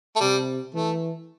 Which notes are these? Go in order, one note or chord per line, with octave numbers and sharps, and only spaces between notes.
A3
C3 G3
E3 A3